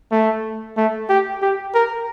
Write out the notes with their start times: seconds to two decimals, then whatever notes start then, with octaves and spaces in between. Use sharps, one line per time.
0.12 A3
0.77 A3
1.09 G4
1.42 G4
1.74 A#4